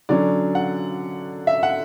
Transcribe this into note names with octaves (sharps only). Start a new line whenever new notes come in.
D3 F#3 C#4 D5
F#5
E5
F#5